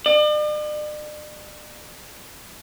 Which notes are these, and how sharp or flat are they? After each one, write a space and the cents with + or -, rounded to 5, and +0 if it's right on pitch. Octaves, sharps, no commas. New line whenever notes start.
D5 +45